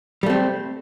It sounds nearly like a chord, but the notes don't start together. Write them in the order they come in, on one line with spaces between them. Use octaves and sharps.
G3 A3 C4